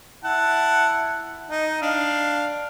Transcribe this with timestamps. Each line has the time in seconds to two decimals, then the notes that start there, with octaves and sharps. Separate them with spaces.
0.24 E4 F#5 A5
1.50 D#4
1.82 D4 F5